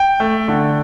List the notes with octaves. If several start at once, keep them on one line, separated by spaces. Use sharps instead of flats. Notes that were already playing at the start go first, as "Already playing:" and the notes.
Already playing: G5
A3
D3